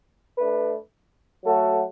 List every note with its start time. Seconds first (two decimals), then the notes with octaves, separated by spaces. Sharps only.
0.37 A3 D4 B4
1.44 F#3 A3 F#4 A4